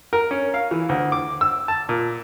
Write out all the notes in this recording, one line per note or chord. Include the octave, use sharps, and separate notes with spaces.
A#4
C#4
F5
E3
D2
D6
E6
A5
A#2